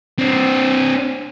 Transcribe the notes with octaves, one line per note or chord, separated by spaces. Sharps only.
C4 D4